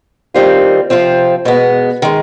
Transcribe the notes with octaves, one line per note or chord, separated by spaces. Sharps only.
D#2 D#3 G3 C4 F4
C3 F3 C4 F4
B2 G#3 B3
D#3 G#3